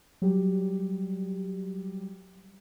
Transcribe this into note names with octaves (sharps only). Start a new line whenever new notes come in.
F#3 G3 G4